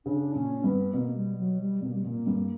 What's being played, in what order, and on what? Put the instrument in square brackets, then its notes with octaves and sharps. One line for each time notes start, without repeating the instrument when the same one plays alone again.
[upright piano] C#3 [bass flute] D4
[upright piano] A#2 [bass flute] C#4
[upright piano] G2 [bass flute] B3
[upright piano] B2 [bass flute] A#3
[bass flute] G3
F#3
G3
[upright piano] B2 [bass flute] A#3
[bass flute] G3
[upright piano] A#2 [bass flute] A#3
[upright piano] G2